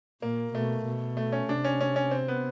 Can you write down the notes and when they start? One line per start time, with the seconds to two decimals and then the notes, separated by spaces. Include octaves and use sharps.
0.22 A#2 A#3
0.54 B2 A3
0.86 B2
1.17 A3
1.32 C#4
1.49 C3 D4
1.64 C#4
1.81 C#4
1.96 C#4
2.11 C4
2.28 B3